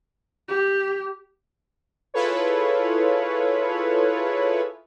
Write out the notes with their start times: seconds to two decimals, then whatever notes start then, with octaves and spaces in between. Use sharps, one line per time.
0.48 G4
2.14 E4 F4 G#4 A4 B4 C#5